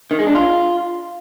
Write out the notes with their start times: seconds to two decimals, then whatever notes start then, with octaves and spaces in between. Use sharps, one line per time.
0.11 D#3
0.19 G#3
0.27 D4
0.35 F4